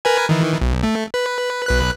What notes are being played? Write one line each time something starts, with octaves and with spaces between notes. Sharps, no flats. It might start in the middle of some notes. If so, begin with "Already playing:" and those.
A#4 B4 G#5
D#3 E3
B1
A3
B4
B1 B4 F#6